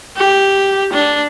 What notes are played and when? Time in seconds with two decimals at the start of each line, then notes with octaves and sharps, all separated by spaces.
0.17 G4
0.93 D4